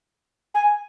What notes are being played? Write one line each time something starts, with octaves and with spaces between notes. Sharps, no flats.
G#5